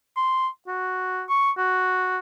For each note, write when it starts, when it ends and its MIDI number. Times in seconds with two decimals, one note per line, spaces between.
0.16 0.47 84
0.67 1.23 66
1.29 1.51 85
1.58 2.19 66